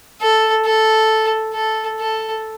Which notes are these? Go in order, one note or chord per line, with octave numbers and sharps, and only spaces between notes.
A4
A4
A4
A4